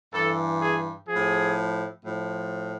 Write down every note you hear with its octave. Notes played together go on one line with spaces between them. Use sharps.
G2 E3 A4
G#4
A2 F3 G#4
A2 F3